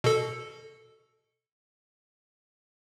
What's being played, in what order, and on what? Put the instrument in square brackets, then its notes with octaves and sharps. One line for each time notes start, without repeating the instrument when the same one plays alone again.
[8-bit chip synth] B2 A4